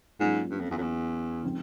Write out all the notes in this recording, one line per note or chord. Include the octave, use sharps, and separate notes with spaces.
G#2 F#3 A#3 C#4 F4
G2
F2
E2
F2
E2
C#3 F3 G#3 C4 D#4